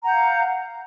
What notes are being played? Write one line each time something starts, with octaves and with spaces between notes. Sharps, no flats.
F5 F#5 A#5 G6